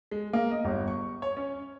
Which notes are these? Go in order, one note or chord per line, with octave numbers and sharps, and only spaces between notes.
G#3
A#3
D#5
G1
C#6
C#5
C#4